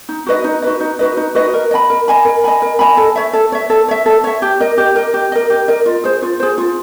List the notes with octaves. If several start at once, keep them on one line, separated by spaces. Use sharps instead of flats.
D#4
F#4 B4 D#5
D#4
F#4 B4 D#5
D#4
F#4 B4 D#5
D#4
F#4 B4 D#5
A#4
D#5 G#5 B5
A#4
D#5 G#5 B5
A#4
D#5 G#5 B5
A#4
D#5 G#5 B5
A4
C#5 E5
A4
C#5 E5
A4
C#5 E5
A4
C#5 E5
G4
A#4 D#5
G4
A#4 D#5
G4
A#4 D#5
G4
A#4 D#5
F4
G#4 C5
F4
G#4 C5
F4